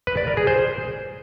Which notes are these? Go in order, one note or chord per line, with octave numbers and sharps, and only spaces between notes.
B4
D5
A#4
G#4
C5